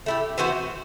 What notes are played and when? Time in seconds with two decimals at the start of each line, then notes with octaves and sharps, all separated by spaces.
0.06 A3 E4 G4
0.38 E3 B3 F#4 C5